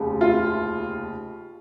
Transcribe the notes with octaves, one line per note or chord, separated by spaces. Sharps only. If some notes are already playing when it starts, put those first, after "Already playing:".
Already playing: F1 D#2 C#3
F4